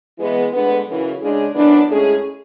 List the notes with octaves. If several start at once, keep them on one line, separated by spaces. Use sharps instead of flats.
E3 G#3 B3
D2 D3 G#3 B3
F#2 C#3 E3
C#3 G#3 D4 G#4
F#2 E3 B3 D4
A2 G#3 C#4 G#4